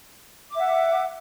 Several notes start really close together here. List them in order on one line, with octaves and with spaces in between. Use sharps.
D6 E5 F#5